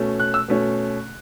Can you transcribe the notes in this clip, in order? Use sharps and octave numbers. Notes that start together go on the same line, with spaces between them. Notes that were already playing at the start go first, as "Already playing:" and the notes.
Already playing: B2 A3 C#4
F#6
E6
B2 A3 C#4